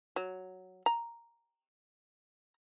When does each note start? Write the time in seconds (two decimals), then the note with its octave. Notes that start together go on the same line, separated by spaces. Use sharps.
0.16 F#3
0.86 A#5